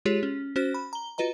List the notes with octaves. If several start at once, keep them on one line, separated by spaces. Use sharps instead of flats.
G#3 F4 G4 G#4 C#5
C#4
C#4 F#4 C5 F#6
B5
A#5 G7
F4 F#4 B4 D#5 A#5